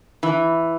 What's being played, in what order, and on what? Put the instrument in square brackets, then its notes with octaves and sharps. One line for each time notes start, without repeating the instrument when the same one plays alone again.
[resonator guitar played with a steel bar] E3